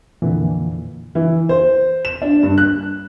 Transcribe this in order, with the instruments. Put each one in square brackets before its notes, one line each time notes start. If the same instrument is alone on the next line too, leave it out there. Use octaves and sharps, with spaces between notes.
[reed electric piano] F2 A#2 D3 E3
[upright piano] E3
C5
E7
D4
G2
F#6